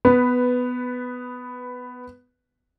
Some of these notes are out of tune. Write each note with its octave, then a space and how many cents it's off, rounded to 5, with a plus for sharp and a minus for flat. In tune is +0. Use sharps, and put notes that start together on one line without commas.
B3 +10 B4 +0